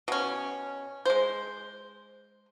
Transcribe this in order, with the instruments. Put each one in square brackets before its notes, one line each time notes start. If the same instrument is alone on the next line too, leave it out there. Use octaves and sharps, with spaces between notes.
[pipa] B2 C#4
G#3 C5